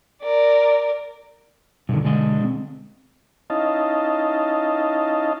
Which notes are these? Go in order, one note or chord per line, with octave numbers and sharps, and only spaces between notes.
A#4 D5
G2 B2 D3 D#3
G#3 D4 D#5
C4
C#4 D#4 E4 D#5 F5 A5